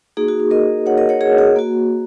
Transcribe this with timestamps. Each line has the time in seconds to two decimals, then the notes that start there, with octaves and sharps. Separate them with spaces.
0.17 A#3 D#4 F#4 G#4
0.28 F#4
0.40 F#4
0.51 A#4 D#5
0.86 C#5 F#5
0.98 A#4 D#5
1.09 C#5 F#5
1.21 G#4 C#5
1.38 G#4 C#5
1.56 A#3 F#4